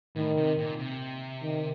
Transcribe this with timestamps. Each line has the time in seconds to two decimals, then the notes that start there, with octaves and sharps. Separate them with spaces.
0.16 A2 D#3
0.37 C3
0.58 A#2
0.79 C3
1.43 D#3